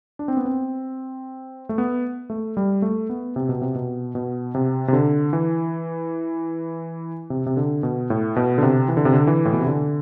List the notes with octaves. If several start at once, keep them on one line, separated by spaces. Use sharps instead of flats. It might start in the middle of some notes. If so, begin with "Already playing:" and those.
D4
C4
B3
C4
A3
B3
A3
G3
A3
B3
C3
B2
C3
B2
B2
C3
C3
D3
E3
C3
C3
D3
B2
A2
B2
D3
C3
E3
D3
C3
D3
E3
A2
B2
C3
D3